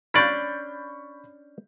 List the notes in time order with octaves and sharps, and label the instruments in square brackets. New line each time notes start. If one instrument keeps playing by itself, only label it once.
[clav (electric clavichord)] C#4 D4 D5 [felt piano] B5 C#6 G6